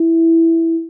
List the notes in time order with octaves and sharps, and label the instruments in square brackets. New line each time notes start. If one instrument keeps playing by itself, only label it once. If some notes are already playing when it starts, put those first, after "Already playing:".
Already playing: [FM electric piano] E4